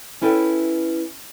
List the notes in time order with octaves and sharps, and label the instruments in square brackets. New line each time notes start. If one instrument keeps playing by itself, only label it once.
[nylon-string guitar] C#4 E4 A4 B4 F#5 G5